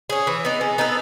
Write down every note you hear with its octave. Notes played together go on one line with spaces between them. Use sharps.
C#4 G#4
E3
B3 D#4
G#3
B3 D#4 A4